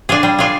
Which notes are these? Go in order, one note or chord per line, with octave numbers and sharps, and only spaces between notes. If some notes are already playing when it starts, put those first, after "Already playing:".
D4 F4 G#4
G3
D4 F4 G#4